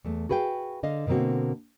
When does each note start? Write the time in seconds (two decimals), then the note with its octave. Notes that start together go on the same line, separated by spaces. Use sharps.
0.05 E2 A3
0.29 F#4 G#4 B4 F5 G5
0.83 D3 D#5 F5
1.07 B2 D3 A#3 C4 F#4